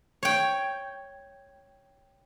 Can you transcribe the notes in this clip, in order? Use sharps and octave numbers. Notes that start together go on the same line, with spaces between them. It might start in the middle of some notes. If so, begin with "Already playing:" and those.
C#5 G5